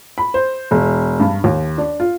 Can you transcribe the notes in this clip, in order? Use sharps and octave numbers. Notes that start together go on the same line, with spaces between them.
B5
C5
E1
G2
D#2
D4
F4